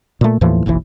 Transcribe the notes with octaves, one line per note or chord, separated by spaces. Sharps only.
A#2 A3
D#2 A2 E3 F3
F#1 B1 B2 E3